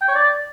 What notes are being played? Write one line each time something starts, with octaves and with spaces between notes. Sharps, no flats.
G5
C#5
D5